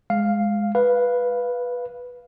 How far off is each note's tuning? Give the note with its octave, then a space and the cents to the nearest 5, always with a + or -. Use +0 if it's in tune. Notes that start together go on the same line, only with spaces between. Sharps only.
G#3 +0 F5 +0
B4 -5 F5 +0